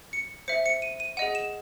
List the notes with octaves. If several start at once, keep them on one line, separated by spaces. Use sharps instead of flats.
C#7
C5 E5 C#7
C#7
D#7
D#7
G#4 D#5 F#5 D#7
E7